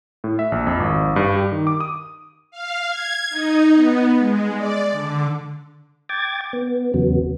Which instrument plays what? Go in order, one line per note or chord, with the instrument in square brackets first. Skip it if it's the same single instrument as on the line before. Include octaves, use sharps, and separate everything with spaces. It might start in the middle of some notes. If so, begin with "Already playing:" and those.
[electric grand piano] A2
E5
A#1
F2
G#1
G2
G4
D#3
D6
D#6
[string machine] F5
G#6
D#4
B3
G#3
D5
D3
[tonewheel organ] G5 D6 G#6 A6
B3
E2 C#3 F#3 B3